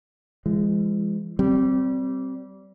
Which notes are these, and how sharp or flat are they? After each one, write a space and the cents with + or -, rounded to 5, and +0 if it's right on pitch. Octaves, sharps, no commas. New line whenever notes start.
E3 +35 G#3 -20
G3 -25 C4 +0